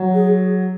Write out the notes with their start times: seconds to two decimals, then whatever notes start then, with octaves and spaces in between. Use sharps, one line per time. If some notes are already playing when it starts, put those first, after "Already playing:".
Already playing: F#3
0.15 G#4